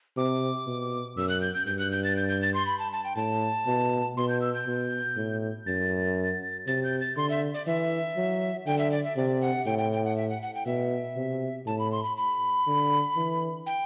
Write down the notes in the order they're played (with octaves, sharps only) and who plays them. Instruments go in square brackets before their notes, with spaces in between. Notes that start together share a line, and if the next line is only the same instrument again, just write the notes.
[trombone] C3 [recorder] D6
[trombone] B2
[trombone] F#2 [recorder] E6
[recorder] F#6
G6
G6
[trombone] G2 [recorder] G6
[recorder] F#6
G6
A6
G6
G6
A6
C6
B5
A5
A5
G5
[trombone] A2 [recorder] A5
[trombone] B2
[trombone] B2 [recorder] C6
[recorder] G6
E6
G6
[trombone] B2
A2
[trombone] F#2 [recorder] A6
[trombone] C3 [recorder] A6
[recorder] G6
A6
[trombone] D3 [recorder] C6
[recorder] E5
D5
[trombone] E3 [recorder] E5
[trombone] F#3
[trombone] D3 [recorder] G5
[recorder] E5
D5
E5
[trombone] C3 [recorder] D5
[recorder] F#5
[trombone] A2 [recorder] G5
[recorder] G5
G5
F#5
E5
F#5
F#5
G5
[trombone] B2 [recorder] E5
[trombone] C3
[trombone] A2 [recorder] A5
[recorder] B5
C6
B5
B5
[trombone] D3
E3
[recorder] G5